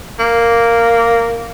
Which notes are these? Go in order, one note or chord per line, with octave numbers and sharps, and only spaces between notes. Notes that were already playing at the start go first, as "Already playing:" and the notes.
A#3